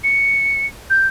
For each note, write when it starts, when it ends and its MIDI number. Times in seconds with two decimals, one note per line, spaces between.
0.04 0.66 97
0.90 1.07 91